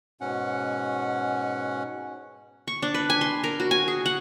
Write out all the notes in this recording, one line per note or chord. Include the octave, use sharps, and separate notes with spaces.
G#2 B2 C#4 F#5
C#6
D4
B4
G#5
C6
A#4
F#4
G#5
G#4
F#5